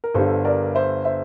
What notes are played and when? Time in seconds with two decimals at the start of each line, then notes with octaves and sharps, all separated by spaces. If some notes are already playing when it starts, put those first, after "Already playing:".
0.04 A#4
0.14 G1 G2 D3 A4 C5
0.45 A#4 D5
0.75 C5 E5
1.05 C5 E5